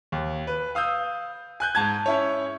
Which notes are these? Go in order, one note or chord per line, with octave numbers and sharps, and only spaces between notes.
D#2
B4
F5 D#6 E6 G6
G#5 F#6 G6
G#2 A5 G#6
C#4 E4 C#5